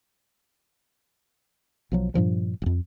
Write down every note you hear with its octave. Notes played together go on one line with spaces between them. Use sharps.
B1 F3 F#3
G2 A#2 F3 G3
D#1 F2